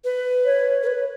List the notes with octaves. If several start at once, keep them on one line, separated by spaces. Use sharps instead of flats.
B4
C#5
A#4
B4